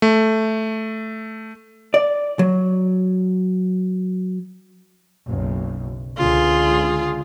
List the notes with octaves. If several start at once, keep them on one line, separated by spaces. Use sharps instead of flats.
A3
D5
F#3
F#1 B1
C#2 D3 F4 G#4